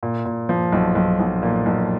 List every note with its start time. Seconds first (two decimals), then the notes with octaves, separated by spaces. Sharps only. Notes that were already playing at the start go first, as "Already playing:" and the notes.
0.03 A#2
0.25 A#2
0.49 F3
0.72 B1
0.95 B1
1.20 B1
1.43 A#2
1.66 B1